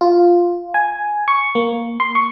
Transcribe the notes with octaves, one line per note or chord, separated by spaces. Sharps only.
F4
G#5
C#6
A#3
C6
C#6